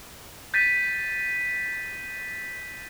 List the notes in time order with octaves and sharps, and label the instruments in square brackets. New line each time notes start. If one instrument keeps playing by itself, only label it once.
[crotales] G6 A6 B6 D#7